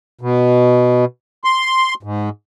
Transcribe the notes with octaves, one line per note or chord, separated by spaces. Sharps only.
B2
C6
G#2